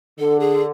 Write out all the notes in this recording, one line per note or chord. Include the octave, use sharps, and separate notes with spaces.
D3 A4
G#4